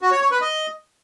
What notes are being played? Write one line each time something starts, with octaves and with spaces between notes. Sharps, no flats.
F#4
C#5
C#5
B4
D#5